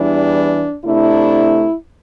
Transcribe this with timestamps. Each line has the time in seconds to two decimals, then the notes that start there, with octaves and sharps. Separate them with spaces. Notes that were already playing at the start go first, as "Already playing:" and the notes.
Already playing: E2 E3 G3 D4
0.85 C3 A3 D4 E4